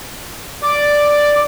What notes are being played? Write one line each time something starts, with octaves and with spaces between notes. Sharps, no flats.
D5 D6